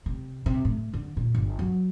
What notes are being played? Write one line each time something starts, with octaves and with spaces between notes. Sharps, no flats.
C3
C3
A2
D3
A#2
G1
F#3